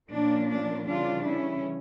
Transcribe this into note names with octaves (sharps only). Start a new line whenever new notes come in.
A#2 F3 A#3 C#4 D4
D4
C#3 E3 G3 C#4 D4 F4
C#4 E4